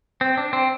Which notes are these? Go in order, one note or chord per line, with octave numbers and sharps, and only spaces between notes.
C4
D4
C4